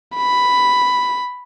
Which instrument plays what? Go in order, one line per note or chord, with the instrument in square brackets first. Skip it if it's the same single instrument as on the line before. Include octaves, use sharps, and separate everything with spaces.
[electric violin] B5